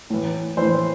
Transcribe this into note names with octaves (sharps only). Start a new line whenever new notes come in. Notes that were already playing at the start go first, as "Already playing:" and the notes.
A2 E3
A2 E3 C5